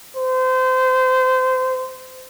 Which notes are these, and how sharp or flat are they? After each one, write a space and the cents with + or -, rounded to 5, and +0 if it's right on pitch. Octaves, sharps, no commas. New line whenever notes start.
C5 -25